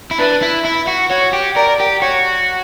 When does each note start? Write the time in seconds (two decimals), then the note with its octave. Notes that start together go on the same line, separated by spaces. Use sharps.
0.11 E4
0.19 D4 B4
0.42 E4
0.65 E4
0.87 F#4
1.10 F#4 C#5
1.33 G4
1.56 A#4 D5
1.80 G4
2.02 F#4 C#5